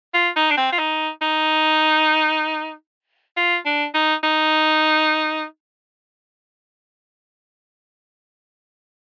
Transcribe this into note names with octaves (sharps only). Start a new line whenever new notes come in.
F4
D#4
D4
C4
F4
D#4
D#4
F4
D4
D#4
D#4